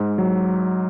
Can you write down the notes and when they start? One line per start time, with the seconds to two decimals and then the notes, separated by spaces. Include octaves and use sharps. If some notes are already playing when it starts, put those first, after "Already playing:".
Already playing: G#2
0.18 F#3